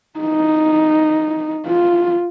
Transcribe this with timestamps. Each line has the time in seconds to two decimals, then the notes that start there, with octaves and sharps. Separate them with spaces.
0.20 D#4
1.67 F4